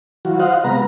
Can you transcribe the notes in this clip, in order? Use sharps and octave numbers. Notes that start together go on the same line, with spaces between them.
E3 F#3 F4 F#4
F4 C5 D#5 F5 F#5
C3 G#3 B3 B4 A#5